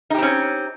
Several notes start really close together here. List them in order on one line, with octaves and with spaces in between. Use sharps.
D#4 G4 C4 C#4